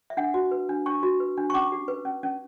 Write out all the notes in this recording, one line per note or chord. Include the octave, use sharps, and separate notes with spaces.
E5
D4 F#5
F#4
B4
D4
D4 C#6
F#4
B4
D4
C#6
C#4 D6
G4
B4
C#4
C#4